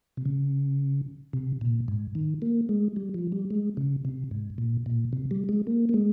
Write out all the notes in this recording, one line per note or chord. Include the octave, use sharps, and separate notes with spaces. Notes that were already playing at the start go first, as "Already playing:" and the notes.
C3
C#3
C3
A#2
G#2
D#3
A#3
G#3
G3
F3
G3
G#3
C#3
C3
G#2
A#2
A#2
C3
G3
G#3
A#3
A#3
G#3